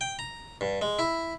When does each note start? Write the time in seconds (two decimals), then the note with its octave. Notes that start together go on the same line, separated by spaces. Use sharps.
0.01 G5
0.19 A#5
0.61 G2
0.82 G#3
0.99 E4